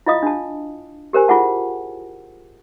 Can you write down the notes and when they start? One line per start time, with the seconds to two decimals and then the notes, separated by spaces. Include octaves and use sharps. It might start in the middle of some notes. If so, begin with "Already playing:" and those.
0.06 E4 F4 D#5 F5 D#6
0.23 D4 A5
1.13 G4 A#4 C5 G#5
1.28 E4 F4 G#4 F#5 A5